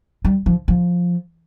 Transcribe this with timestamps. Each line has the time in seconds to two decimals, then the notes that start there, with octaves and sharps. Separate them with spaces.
0.25 G3
0.46 F3
0.68 F3